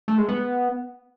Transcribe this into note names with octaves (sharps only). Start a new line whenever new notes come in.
A3
G#3
B3